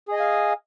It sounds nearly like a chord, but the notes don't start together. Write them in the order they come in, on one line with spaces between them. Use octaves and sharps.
G#4 D#5 G#5 F5